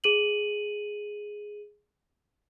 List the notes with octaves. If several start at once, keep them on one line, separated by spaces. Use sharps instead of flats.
G#4 D#7 F#7